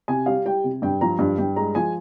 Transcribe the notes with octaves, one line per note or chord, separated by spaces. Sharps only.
C3 G#5
G3 F5
G3 G5
C3
G2 G5
F3 A#5
G2
G2 G5
G#3 A#5
F3 G#5